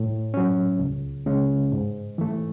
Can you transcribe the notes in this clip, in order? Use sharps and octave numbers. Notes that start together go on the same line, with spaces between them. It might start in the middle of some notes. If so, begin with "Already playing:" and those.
Already playing: A2
F#3 C#4
C#2
C#3 G#3 C#4
G#2
E3 A3